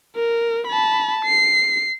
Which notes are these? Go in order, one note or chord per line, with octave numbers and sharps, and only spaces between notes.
A#4
A5 B5
C7